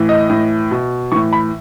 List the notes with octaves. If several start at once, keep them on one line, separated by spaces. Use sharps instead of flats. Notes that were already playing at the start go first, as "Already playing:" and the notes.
Already playing: A2 E3
D#5
A2 E3
B2
A2 E3 C#6
B5